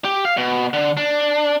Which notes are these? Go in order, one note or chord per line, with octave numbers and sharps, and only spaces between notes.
G4
F5
B2
D3
D4